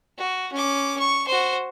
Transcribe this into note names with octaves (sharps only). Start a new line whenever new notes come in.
F#4
C#4 D6
C#6
F#4 C5